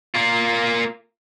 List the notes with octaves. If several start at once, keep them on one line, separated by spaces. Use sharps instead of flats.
A#3 F4